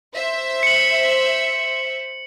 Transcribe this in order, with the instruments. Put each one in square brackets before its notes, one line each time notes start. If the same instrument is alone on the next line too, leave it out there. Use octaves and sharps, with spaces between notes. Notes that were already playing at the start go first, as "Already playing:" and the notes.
[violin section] C5 E5
[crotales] C#7 F#7